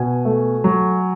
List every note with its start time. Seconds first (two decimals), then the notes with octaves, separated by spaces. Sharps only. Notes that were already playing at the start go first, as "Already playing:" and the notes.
Already playing: B2 G#5
0.25 A3
0.64 F#3